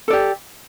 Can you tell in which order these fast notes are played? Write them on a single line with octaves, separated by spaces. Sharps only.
A4 D5 G4